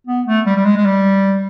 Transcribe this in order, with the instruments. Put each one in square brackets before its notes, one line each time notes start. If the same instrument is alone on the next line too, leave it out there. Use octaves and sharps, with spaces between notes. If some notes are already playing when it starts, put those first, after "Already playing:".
[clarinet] B3
A3
G3
G3
G#3
G#3
G3